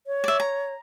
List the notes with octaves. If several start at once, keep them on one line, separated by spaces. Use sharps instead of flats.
C#5
D5 E5
A#5